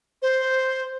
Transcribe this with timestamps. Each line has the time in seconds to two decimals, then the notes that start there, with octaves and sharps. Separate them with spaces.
0.22 C5